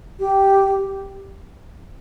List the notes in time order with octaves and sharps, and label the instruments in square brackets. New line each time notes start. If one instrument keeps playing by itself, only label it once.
[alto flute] G4